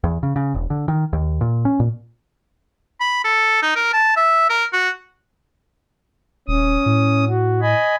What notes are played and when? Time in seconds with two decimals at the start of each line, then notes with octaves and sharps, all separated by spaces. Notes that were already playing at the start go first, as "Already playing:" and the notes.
0.04 E2
0.23 C#3
0.36 C#3
0.55 E1
0.70 D3
0.88 D#3
1.13 D#2
1.41 A#2
1.65 C#4
1.80 A#2
3.01 B5
3.24 A4
3.62 D#4
3.76 A#4
3.93 A5
4.16 E5
4.50 A#4
4.73 F#4
6.48 D#1 C#4 D#6
6.86 A2
7.29 F#4
7.61 D#5 G#5 B5